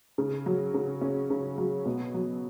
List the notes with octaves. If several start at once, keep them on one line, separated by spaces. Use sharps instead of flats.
C#3
F#3
C#3
C#4
C#3
F#3
B2
F#3